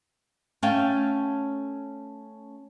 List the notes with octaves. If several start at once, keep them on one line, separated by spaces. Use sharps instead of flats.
A3 C#4 C#5 F5 G5 A5